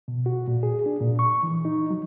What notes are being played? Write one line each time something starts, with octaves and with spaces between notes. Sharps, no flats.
B2
F#4
A#2
G#4
D4
A#2
C#6
E3
D#4
F#3